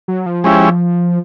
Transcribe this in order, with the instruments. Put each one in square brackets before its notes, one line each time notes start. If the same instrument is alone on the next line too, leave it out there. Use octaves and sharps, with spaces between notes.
[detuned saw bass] F#3
F3
[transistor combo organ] G#3 C#4 E4 G4